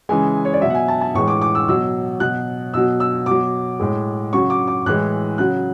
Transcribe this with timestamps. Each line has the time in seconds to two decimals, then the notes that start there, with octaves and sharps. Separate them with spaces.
0.09 C#3 E3 G#3 G#5
0.45 C#5
0.53 D5
0.61 B2 F#3 E5
0.70 F#5
0.75 G#5
0.88 A5
1.01 A5
1.14 A2 E3 G#3 C#6
1.28 D6
1.42 D6
1.55 E6
1.68 B2 F#3 E6
2.20 B2 F#3 F#6
2.74 B2 F#3 E6
3.00 E6
3.26 B2 F#3 D6
3.80 A2 G#3
4.33 C#3 F#3 C#6
4.50 D6
4.68 D6
4.86 A2 E3 G#3 F#6
5.38 C#3 F#3 F#6